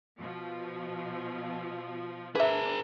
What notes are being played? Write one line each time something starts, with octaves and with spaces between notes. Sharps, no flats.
B2 F3
D4 G#4 A#4 B4 E5